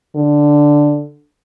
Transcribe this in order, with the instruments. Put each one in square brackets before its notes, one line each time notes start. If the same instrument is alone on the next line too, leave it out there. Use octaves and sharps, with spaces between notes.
[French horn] D3